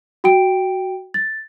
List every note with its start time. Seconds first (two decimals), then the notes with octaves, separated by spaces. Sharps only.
0.24 F#4 G5 D7
1.14 A6